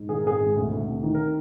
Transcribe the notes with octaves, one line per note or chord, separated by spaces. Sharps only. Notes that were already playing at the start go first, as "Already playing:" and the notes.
Already playing: G#2
D#3 G#4
A#4
G#1 G#4
G#1
D2
D2
C3
D#3
A#4